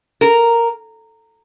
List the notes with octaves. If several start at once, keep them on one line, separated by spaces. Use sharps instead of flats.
A#4